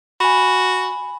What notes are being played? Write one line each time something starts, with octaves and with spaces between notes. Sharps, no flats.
F#4 G#5 B5